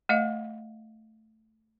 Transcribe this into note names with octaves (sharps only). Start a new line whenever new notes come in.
A3 D#5 F5